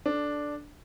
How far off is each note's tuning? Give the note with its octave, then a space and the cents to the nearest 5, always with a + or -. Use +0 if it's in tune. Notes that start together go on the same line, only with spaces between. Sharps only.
D4 +0 A4 -10